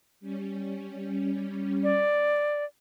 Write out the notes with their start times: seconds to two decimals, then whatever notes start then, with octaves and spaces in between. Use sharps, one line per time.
0.20 G3 C#4
1.83 D5